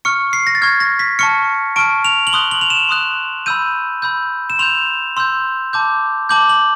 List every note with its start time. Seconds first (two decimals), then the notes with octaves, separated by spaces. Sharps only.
0.05 C#6 F6 C#7
0.33 C7
0.47 A#6
0.55 A6
0.62 C#6 F6 G#6
0.80 A#6
0.99 B6
1.19 A5 C#6 F6 C#7
1.76 A5 C#6 F6 D7
2.05 F7
2.27 F#7
2.33 C6 D#6 F#6 G7
2.51 F#7
2.61 F7
2.70 E7
2.89 C6 D#6 F#6
3.46 B5 E6 G6 D#7
4.02 B5 E6 G6
4.50 E7
4.59 C6 E6 G6 F7
5.17 C6 E6 G6
5.73 A5 D6 G6
6.29 A5 D6 G6 F#7
6.49 F#7